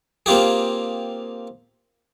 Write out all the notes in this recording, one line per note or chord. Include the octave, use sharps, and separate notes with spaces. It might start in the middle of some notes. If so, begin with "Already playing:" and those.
A#3 C4 F4 G4 G#4